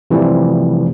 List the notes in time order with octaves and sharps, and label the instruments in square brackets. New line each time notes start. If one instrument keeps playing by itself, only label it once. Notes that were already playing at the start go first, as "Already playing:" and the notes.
[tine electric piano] C3 E3 F3 G3 A3